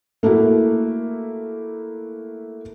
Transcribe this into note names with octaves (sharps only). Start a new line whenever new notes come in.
A3 A#3 E4 F#4